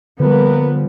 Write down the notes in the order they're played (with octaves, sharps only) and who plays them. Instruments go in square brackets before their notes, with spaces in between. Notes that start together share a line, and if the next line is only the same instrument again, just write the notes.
[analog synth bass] D3 [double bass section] F3 G3 [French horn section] A#3 A#4 B4 [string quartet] B3